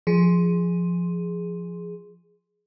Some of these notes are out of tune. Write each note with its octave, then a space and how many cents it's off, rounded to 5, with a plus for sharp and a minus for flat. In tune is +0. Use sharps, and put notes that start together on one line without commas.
F3 +0 G#4 +0